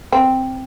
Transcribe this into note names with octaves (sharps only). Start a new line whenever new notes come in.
C4